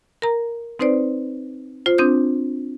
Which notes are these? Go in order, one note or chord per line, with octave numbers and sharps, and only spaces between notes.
A#4 A#5
C4 D#4 B4 C5 D5
F4 C5
C4 D4 D#6 G6